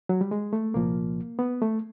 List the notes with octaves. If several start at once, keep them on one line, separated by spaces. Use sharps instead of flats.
F#3
G3
G#3
A3
C2 A#2 F3 A#3
B3
A3